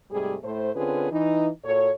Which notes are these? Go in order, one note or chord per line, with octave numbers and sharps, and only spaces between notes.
G#2 C3 G3 A3 G#4
A2 A3 C5
D3 C4 C#4 F4 G#4 B4
E3 D#4
A#2 F#4 A4 C#5